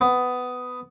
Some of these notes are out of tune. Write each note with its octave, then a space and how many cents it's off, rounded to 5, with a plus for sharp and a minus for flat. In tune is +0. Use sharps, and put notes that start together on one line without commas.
B3 +15